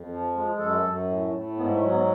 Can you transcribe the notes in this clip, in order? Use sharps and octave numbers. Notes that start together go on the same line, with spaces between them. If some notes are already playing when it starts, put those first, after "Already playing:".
Already playing: F2
F3
G#3
F#2 A4
F#2
A2
A2
G#2 B3
A3
F#3
B3